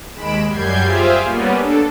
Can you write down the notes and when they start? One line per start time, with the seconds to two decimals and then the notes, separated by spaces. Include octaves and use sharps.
0.13 D#2 G#3 B5 D7 E7
0.47 F#2 G3 G6 G#6 C7
0.82 F4 G4 G#4 C5 E5 F5
1.24 G3 A#3 B3 C#4
1.57 D4 A4